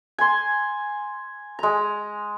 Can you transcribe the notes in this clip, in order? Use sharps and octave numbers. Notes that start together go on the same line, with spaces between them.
G#5 C6
G#3 A#5